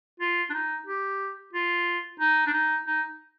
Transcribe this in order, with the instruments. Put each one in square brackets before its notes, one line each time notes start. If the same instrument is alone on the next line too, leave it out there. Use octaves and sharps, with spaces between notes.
[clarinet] F4
D4
D#4
G4
F4
D#4
D4
D#4
D#4